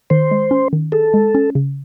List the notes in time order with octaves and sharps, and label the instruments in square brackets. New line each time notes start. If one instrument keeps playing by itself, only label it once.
[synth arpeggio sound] D#3 [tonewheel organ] C5
[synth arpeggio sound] G#3
C#4
D#3
[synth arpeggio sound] G#4 [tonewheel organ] A4
[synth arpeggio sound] G#3
C#4
C#3